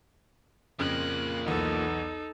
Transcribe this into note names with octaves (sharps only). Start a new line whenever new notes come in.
F2 C#3 F3 A#3 F#6
B1 E2 B3 D#4 A4